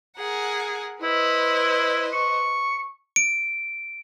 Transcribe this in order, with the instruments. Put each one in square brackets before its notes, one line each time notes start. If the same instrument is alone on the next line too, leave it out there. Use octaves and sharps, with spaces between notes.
[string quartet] G#4 A#4 F#5
[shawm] E4 [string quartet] B4 C5 D#5
[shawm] C#6
[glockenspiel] D7